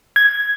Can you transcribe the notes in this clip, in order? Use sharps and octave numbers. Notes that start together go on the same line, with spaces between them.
G#6